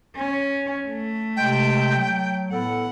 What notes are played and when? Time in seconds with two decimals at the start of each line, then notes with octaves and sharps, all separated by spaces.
0.16 C#4
0.85 A3
1.37 C3 G#3 G5
1.96 F#3
2.52 A2 B3 A4 F#5